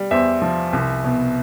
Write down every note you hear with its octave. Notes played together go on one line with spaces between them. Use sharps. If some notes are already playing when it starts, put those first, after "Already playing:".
Already playing: G3
E2 C5 E5
F3
C2
B2